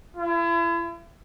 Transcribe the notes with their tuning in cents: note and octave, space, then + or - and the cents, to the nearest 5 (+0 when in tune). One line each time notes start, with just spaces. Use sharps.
E4 +40